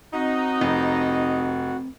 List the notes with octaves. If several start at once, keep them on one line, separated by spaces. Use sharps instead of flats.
C4 D#4 F#4
F1